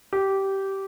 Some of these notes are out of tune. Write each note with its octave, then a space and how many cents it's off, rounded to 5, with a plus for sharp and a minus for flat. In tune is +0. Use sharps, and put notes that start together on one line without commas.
G4 -15